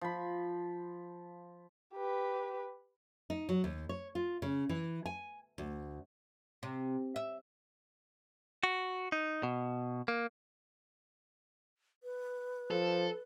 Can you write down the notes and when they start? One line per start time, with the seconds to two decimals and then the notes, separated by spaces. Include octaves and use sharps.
0.01 F3 B5
1.94 G4 B4
3.30 D#4
3.49 F#3
3.64 D#2
3.89 C#5
4.15 F4
4.42 C#3
4.69 E3
5.06 G#5
5.58 D2
6.63 C3
7.16 E5
8.63 F#4
9.12 D#4
9.43 B2
10.08 A#3
12.03 B4
12.71 F3 A4